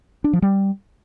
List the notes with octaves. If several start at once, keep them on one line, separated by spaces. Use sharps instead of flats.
D4
F3
G3